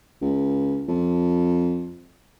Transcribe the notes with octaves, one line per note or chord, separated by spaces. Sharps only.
C#2
F2